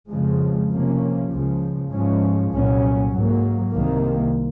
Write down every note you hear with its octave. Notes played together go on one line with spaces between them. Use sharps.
F2 C#3 F3 G#3
C3 F3 A#3 C#4
C#2 C#3 F3
G#2 F3 G#3 C#4
C2 A#2 F#3 C#4
G#2 F#3 A#3
C2 C3 D#3 A#3